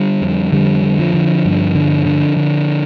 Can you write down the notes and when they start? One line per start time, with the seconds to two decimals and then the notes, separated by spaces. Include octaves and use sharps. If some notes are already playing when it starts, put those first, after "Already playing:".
Already playing: D3 G3
0.22 F2
0.52 F2 D3 G3
0.83 D3
0.99 F3
1.14 D3
1.45 G2
1.75 D3
2.06 D3
2.37 D3